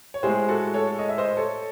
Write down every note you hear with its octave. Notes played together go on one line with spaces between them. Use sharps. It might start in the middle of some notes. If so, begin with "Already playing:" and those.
C#5
A2 G#3 G#4 C5
F#4 A4
A4 C#5
D#5
E5
C5 D#5
A4 C#5